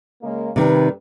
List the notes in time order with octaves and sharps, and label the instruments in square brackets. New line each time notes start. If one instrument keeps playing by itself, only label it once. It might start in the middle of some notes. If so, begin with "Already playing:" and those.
[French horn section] C#3 G#3 A#3
[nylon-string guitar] C3 D#3 [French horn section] G3 B4